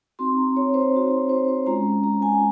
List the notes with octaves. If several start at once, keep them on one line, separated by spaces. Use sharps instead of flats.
C4 D#4 F#4 C6
A#5
C#5
C5
C4 D#4 F#4
C5
C5
C5
G#3 C#4 F4 A#5
A#5
G#5